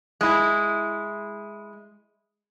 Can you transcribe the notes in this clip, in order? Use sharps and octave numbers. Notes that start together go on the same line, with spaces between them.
G#3 E4